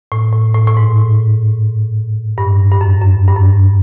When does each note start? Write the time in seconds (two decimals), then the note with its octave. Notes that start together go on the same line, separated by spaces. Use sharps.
0.12 A2
0.33 A2
0.54 A2
0.67 A2
0.77 G#2
2.38 G2
2.71 G2
2.81 F#2
3.01 F#2
3.28 G2
3.36 F#2